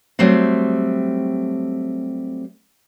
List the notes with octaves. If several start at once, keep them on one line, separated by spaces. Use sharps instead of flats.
F#3 G3 A3 C4